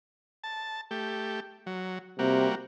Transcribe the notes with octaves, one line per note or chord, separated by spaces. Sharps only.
A5
A3 G4
F#3
C3 G3 A#3 F#4